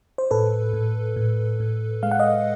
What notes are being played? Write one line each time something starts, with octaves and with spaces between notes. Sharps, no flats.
C5
A2 A4 B4
A2
A2
A2
G#3 F5
F#5
D#5 F5